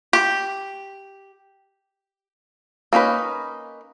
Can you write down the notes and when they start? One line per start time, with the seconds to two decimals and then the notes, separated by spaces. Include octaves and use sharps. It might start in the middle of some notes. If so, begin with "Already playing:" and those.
0.13 G4
2.93 A#3 C#4 D#4 B4